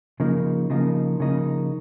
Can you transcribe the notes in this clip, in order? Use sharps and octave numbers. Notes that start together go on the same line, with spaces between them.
C#3 F3 A#3 D#4
C#3 F3 A#3 D#4
C#3 F3 A#3 D#4